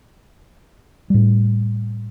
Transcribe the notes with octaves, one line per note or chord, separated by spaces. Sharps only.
A2 G3